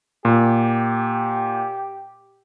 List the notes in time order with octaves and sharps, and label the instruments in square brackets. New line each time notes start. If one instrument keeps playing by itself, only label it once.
[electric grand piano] A#2 [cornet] G4